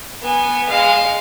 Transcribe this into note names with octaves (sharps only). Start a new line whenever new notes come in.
B3 G#5
G#3 F5